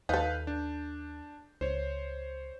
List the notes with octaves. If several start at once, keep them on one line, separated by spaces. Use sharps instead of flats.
D#2 D#4 A4 B4 F5 G6
D4
C#2 C5 C#5